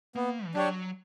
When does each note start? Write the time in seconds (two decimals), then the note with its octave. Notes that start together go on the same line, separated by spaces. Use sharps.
0.15 A#3 B3
0.46 E3
0.55 F#3 D4 G4 C#5